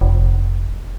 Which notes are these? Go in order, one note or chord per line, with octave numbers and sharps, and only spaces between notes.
F1